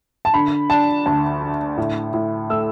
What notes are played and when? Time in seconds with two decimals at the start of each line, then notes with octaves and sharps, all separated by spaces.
0.25 A5
0.33 D3 B5
0.70 D4 A5
1.06 D2 A5
1.42 D3
1.77 A2
2.14 A2
2.50 A3 E6